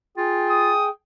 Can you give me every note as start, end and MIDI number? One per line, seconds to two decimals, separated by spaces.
0.17 0.72 65
0.17 0.89 68
0.17 0.89 79
0.50 0.90 87